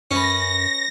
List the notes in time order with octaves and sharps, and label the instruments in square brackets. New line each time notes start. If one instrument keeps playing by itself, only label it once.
[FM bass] F#2 [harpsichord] C#4 B4 [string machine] A#6